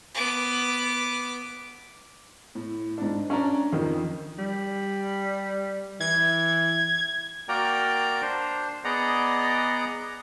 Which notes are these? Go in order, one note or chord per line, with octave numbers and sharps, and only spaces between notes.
B3 D6
A2
G#2 D4
C#4 D4 D5 A#5
F2 D#3
G3
E3 G#6
A#3 F#4 A#4 D5 G5 A#5
D4 C5
B3 G#4 D5 D#5 F#5 A#5